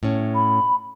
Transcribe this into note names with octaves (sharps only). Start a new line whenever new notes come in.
A2 C#4
B5